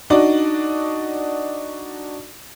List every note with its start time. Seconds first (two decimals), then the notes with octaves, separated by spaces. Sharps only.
0.10 D4 D#4 F#4 D5 D#5